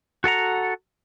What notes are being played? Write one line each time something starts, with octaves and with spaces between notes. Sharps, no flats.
F#4 A4 F#5 A#5